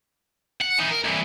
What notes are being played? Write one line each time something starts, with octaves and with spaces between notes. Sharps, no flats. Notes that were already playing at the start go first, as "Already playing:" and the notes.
F#5
E3 D#4
A#4
C2 E3